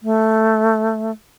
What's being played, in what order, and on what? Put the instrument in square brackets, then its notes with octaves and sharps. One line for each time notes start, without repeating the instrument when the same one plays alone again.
[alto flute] A3